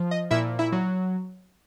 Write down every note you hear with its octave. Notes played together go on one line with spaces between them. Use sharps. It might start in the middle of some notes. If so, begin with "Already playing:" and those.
Already playing: F3
D#5
A#2 E4 E5
E4 E5
F#3